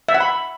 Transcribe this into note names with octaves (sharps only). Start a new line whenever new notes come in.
E5
F#5
B5